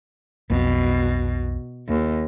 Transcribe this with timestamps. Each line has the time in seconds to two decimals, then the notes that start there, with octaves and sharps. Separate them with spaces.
0.50 B1 F2 B2 F3
1.88 D#2